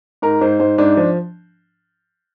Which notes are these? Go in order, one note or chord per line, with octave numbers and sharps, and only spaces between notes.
G#2 A#4
G#2 C5
G#2 C5
G#2 D4
F3